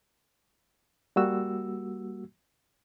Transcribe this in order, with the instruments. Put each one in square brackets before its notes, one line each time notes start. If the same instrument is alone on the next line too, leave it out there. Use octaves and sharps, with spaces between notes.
[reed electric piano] G3 A#3 F#4 E6